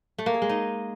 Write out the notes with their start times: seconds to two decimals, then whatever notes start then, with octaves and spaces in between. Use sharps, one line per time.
0.18 A3
0.26 A#3
0.34 G#4
0.42 G#3
0.49 D#4